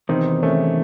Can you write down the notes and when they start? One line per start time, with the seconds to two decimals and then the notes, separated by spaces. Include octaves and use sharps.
0.09 E2 C3 D#3 C4 D#4
0.43 A3 C#4